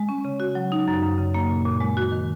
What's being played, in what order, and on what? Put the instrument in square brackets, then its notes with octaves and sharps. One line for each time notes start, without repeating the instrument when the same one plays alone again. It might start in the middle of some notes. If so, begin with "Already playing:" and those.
Already playing: [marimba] G#3
C#4
C#3
F#4
F#3
D#4
F#2
F#2
C#3
A#3
A#2
A#2
G#3
F#4
D#3